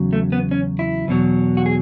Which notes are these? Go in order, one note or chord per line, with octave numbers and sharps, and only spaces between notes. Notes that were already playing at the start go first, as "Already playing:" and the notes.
Already playing: E2 C#3 F#3
A3
B3
C#4
E4
E2 B2 F#3
F#4
G#4